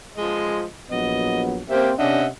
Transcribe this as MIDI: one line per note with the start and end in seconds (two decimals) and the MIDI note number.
0.17 0.65 53
0.17 0.65 56
0.17 0.65 75
0.91 1.61 34
0.91 1.61 54
0.91 1.61 59
0.91 1.41 75
1.70 1.90 58
1.70 1.95 60
1.70 1.90 67
1.70 1.90 76
1.99 2.28 48
1.99 2.28 61
1.99 2.28 62
1.99 2.25 75
1.99 2.25 76
1.99 2.25 78